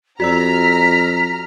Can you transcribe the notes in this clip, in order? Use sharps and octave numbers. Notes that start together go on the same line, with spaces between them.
F2 F#4 D5 A#5 E6 F6 B6